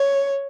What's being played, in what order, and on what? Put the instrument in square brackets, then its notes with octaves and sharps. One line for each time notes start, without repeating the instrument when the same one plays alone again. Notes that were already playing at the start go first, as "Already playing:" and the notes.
Already playing: [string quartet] C#5